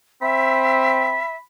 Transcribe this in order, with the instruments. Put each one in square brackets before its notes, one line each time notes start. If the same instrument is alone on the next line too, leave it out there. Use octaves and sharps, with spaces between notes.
[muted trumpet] C4 [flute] E5 [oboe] B5